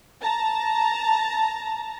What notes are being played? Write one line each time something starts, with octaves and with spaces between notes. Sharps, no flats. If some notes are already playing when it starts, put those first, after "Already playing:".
A5 A#5